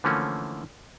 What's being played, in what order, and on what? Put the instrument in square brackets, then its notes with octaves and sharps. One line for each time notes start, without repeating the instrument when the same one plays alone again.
[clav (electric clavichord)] D3 E3 F3 A3 A#3 C#4